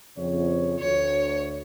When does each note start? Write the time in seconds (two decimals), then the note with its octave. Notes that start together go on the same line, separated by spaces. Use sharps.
0.17 F2 C#3 C#5
0.79 D2 C#5